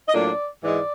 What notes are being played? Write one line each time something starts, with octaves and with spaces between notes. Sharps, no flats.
D#5
A2 F#3 A#3 D4 F4 D5
G#2 E3 G#3 D5